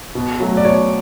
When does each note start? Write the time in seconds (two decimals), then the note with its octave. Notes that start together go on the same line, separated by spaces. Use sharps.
0.15 B2
0.40 F#3 A3
0.57 D5
0.65 B2 C#5